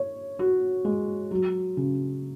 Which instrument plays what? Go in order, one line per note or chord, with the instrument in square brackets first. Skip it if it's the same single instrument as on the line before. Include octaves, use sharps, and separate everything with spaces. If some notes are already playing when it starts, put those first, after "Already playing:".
Already playing: [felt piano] C#5
F#4
G#3
F#3
C#3